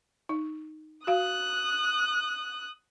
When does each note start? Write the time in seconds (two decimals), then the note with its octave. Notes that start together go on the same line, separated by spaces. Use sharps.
0.29 D#4
1.07 F#4 F5 D#6 F#6